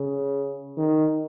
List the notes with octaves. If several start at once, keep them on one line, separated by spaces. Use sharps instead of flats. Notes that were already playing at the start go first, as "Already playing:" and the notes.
Already playing: C#3
D#3